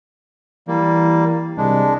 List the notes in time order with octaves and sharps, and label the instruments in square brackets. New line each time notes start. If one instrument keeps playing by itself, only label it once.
[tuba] E3 [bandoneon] G3 A#3
[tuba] C2 [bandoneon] G#3 D4